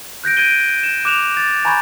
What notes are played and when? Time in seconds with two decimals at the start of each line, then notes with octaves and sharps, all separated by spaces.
0.24 F#6 G6 A#6 D7
0.37 G6 G#6 A#6 D7 D#7 G7
0.83 E7
1.05 D6 F#6 E7 F7
1.37 G#6 A6
1.65 G#5 A#5 B5 C#6 G6 G#6